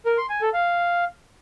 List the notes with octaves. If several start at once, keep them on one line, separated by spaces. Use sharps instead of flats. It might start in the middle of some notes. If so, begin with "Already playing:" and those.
A#4
C6
G#5
A4
F5